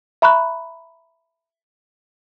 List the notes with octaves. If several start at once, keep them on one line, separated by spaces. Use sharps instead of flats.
E5 A#5 B5 C#6 F#6